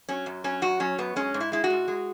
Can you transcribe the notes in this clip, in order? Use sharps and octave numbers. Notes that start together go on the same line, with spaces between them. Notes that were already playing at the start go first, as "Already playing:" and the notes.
F#3 C#4
F#2
F#3 C#4
F#2 F#4
F#3 C#4
F#2 B3
G#3 C#4
G#2
E4
G#3 E4
F#4
G#2
G#3